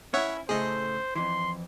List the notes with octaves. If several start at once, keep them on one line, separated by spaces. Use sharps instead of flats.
C#4 E4 C#5 E5 F#5
A2 C#3 A3 G#4 C5 D#5
F2 E3 C6